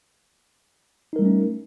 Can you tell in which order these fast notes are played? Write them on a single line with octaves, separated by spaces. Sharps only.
D#4 A#4 G3 A3 C#4